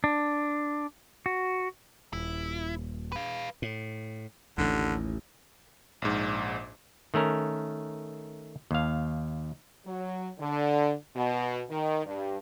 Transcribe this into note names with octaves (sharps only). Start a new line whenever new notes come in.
D4
F#4
D#1 E4
B4 F5
A2
A1 D#2 D3
A#1 G#2
D#3 A3 C#4 A#4
D#2 F5
F#3
D3
B2
D#3
G2